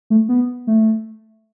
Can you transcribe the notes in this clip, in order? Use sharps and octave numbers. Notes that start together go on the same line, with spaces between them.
A3
B3
A3